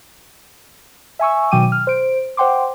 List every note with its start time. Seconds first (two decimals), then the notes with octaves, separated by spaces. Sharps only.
1.19 E5 G#5 C#6 E6
1.51 B2 D#3 F#3 G5 D6 D#7
1.72 F6
1.87 C5 D7
2.37 C5 F#5 G5 C6 D6